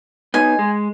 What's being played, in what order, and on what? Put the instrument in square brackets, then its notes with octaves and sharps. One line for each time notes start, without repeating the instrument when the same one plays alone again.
[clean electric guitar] B3 D#4 [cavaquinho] G#5
[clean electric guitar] G#3